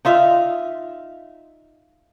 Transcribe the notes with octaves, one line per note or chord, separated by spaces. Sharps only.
D#4 F4 E5 F5